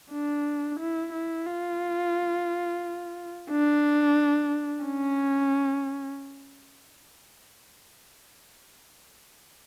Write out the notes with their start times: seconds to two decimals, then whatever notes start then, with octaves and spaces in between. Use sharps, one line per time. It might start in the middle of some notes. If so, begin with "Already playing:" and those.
0.11 D4
0.80 E4
1.13 E4
1.46 F4
3.51 D4
4.85 C#4